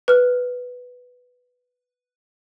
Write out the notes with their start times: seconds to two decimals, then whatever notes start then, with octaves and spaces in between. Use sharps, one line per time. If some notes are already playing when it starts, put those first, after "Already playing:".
0.08 B4 F6